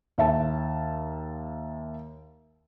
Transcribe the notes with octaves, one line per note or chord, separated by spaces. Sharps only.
D#2 E5 A5